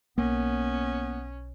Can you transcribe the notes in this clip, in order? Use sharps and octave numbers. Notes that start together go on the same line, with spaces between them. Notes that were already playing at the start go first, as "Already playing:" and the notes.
B1 A#3 B3 C#4